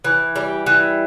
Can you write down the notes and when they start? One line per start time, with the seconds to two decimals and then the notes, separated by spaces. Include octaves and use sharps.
0.05 E3
0.36 G3
0.66 E3